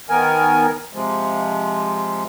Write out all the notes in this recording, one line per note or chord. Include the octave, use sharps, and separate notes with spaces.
D#3 B3 A#4 G#5
C3 F3 G#3